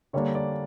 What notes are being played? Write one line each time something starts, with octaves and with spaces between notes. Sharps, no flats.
D3 G3 A#3 D4 C#5
D5